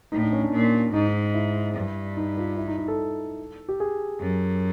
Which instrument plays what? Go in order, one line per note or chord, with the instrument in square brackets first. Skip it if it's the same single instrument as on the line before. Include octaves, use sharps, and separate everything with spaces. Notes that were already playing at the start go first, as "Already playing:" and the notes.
[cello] A2 [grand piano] D#4
[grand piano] D4
C#4
D4
[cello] A#2
[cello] G#2 [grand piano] D#4
[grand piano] D#4
E4
[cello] G2
[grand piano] D#4
F4
E4
D#4
D#4
A4
G4
G#4
[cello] F#2